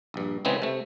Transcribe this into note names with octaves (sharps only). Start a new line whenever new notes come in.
A#1 G2
C#3 E3 G#3 B3 C4
C3 A3